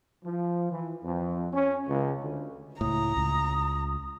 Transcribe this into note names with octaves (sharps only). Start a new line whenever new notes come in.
F3
E3
F2
C#4
C#2
D2
C#2 A2 A#5 D#6
C#2